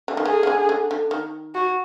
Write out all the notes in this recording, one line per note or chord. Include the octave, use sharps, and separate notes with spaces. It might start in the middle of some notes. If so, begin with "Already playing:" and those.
D3
D#3
D3 G#4
D#3
D3
D3
D3
D#3
F#4